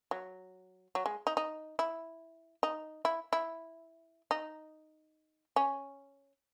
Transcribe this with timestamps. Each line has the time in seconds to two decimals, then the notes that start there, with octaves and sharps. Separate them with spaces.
0.11 F#3
0.95 F#3
1.06 G#3
1.27 D#4
1.37 D#4
1.79 E4
2.63 D#4
3.05 E4
3.33 E4
4.31 D#4
5.56 C#4